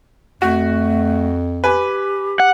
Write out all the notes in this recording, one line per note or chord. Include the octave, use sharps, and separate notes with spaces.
F2 A3 F#4
G4 B4 G#5
F#5